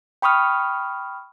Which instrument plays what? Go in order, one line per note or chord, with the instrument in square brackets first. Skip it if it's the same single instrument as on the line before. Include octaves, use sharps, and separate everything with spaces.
[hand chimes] G5 B5 C#6 D#6 F6